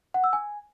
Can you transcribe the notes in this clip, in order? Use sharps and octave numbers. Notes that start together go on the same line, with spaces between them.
F#5
E6
G#5